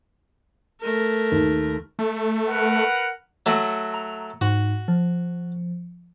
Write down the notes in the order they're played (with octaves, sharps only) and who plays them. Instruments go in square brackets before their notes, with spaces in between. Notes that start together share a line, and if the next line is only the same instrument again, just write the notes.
[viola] A3 A#4
[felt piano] D#2
[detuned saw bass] A3
[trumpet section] A#4 B4 F#5
[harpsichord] F#3 A3 F#4
[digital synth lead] A#5
[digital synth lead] G#2 [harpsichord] F#4
[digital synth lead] F3